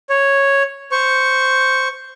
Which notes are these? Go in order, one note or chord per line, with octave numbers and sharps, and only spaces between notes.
C#5
C5 C#6